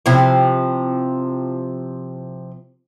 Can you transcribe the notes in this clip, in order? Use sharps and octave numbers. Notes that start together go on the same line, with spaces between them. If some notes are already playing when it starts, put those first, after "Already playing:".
C3 F3 E4